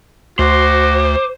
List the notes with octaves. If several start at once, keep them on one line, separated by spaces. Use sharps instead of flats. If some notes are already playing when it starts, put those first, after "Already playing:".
D2 F#4 C5 D6